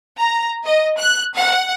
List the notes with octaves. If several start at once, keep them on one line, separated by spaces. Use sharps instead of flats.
A#5
D#5
F#6
F#5